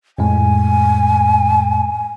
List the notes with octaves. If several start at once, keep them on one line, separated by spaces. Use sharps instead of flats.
F2 A2 G#3 G#5